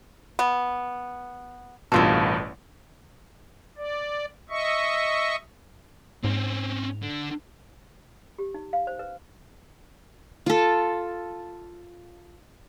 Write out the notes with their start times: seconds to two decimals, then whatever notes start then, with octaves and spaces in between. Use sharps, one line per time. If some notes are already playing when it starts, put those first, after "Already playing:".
0.39 B3
1.92 A1 G2 B2 A#3 F4 A4
3.77 D5
4.50 D#5 E5 C#6
6.24 G#2 C4 C#4
7.02 D3
8.39 G4
8.54 D#4
8.73 F5
8.87 C5
8.99 B4
10.46 F4 A4